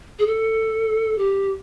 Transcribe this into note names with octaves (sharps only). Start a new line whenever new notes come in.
G#4
A4
G4